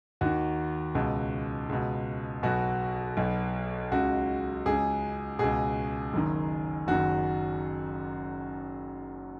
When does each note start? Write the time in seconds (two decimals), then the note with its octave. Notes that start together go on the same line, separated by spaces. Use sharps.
0.21 D#2 D#3 F#4
0.95 C#2 B2
1.69 C#2 B2
2.43 B1 B2 F#4
3.17 B1 B2
3.92 C#2 C#3 F#4
4.66 C#2 C#3 G#4
5.39 C#2 B2 G#4
6.14 F#1 F#2 D#3
6.88 F#1 F#2 D#3 F#4